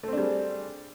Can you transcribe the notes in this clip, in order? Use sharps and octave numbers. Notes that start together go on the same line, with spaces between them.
G3 A3 C4 D4 G#4